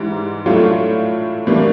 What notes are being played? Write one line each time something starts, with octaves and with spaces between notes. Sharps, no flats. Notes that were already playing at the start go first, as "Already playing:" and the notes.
Already playing: G#2 E3 G3
A2 F#3 A3 D4 F4
A2 E3 G3 A#3 D4